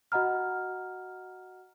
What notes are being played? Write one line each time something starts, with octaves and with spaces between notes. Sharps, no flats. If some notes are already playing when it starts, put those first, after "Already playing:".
F#4 D#5 F#5 A#5 F6